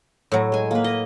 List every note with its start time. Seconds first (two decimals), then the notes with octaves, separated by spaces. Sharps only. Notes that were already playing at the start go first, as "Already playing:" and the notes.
0.32 A2 F#3
0.52 G#3 G#5
0.71 A#3 B4
0.84 D#5